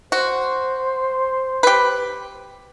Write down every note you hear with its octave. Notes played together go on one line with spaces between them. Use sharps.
F#4 C5
G4 B4